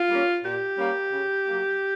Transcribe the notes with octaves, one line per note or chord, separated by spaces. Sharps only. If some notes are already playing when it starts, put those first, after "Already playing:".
Already playing: F4
G3 A#3 C#4
A#2 G4
G3 A#3 C#4
C#3
F#3 A#3